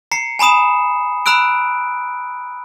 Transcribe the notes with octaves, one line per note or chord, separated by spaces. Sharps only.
A#5 C7 C#7
G#5 A#5 B5 D#6 E7
A#5 B5 E6 F#6 D7